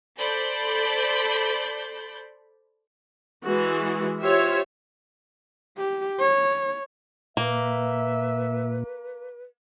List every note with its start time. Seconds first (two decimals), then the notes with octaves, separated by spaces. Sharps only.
0.16 A4 C5 D5 B5 G6
3.44 E3 G#3 F#4
4.21 F4 G4 C5 C#5 E5
5.77 G4
6.19 C#5
7.37 A#2 A#3 B4 E5